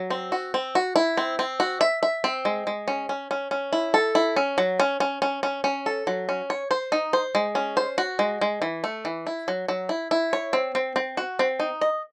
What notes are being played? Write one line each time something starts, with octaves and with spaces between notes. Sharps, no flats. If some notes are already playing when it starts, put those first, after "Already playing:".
Already playing: F#3
C4
F#4
C4
F#4
E4
C4
C4
F#4
E5
E5
C4
G#3
G#3
C#4
C#4
C#4
C#4
E4
A4
E4
C#4
F#3
C#4
C#4
C#4
C#4
C#4
A4
F#3
C#4
C#5
C5
D#4
C5
G#3
C#4
C5
F#4
G#3
G#3
E3
A3
E3
E4
F#3
F#3
E4
E4
C#5
C4
C4
C4
F#4
C4
D#4
D#5